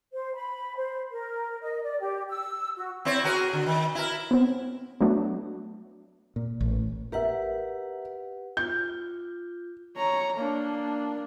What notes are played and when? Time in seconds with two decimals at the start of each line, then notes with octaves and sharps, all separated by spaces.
0.13 C5
0.35 B5
0.76 C5
1.11 A#4
1.61 D#5
1.83 D5
2.00 G4
2.29 E6
2.76 F#4
3.05 C4 E4 C#5
3.24 F#4 G#4 A#4
3.53 D3
3.66 D#3
3.95 E4 A#4
4.31 B3 C4
5.01 F#3 A3 B3 D4 F#4
6.36 A#2
6.60 A1
7.12 G4 A#4 B4 E5 F#5
8.57 F4 G6
9.98 C#5 A#5
10.37 A#3 D4